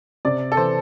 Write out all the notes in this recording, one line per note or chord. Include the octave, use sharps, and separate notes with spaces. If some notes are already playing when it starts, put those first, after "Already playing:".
C3 D5
A4
E3 C5